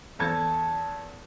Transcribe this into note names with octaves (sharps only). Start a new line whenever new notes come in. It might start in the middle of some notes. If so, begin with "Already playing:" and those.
E2 A4 A5 G#6